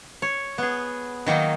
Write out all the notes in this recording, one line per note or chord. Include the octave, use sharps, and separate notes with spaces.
C#5
B3 G#4
D#3 F#3 A#3 D#4